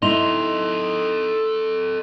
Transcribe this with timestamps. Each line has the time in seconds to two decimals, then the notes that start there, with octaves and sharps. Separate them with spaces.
0.02 D#4 E4 A4 D#5 C6 F7 G7